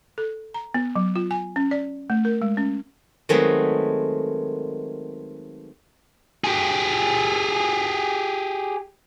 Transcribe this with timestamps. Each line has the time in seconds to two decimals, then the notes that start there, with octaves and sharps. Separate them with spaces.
0.18 A4
0.54 A#5
0.74 B3
0.96 F#3
1.16 F4
1.31 G#5
1.56 C#4
1.71 D5
2.10 A3
2.25 A#4
2.42 G#3
2.57 C#4
3.29 D#3 F#3 G#3 A3 B3 C4
6.44 G4 G#4